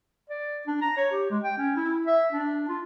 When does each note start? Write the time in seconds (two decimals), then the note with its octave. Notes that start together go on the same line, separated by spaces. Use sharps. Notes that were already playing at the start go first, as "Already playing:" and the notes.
0.30 D5
0.67 D4
0.82 A#5
0.97 C#5
1.12 G4
1.30 G#3
1.44 G5
1.58 C#4
1.76 E4
2.07 E5
2.33 D4
2.69 F4